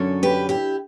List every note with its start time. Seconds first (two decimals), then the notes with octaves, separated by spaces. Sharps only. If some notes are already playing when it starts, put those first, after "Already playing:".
Already playing: F#2 D3 F#3 C#4 A4 C#5
0.23 G4 B4
0.49 E4 G4